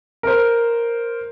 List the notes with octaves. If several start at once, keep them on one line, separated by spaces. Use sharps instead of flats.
A#4 C5